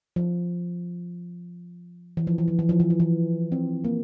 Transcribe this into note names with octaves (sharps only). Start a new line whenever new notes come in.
F3
E3
F3
E3
F3
E3
F3
E3
F3
E3
C4
A#3